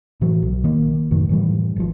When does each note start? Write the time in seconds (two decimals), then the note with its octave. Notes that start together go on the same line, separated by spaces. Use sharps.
0.21 A2 E3 F#3
0.42 B1
0.64 D#3 A#3
1.11 F1 F#2 A2 D#3
1.29 A2 E3 G3
1.76 G#1 F3